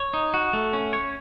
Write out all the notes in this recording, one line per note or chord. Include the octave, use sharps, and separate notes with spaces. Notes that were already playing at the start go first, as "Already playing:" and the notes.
Already playing: C#5
D#4
F#4
A3
C#4
C#5